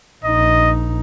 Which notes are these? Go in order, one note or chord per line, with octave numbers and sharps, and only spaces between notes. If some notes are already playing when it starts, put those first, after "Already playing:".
A#1 D#4 D#5